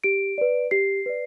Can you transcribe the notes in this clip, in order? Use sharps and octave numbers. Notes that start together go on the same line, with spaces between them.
G4 D7
B4 D5
G4 C7
B4 D5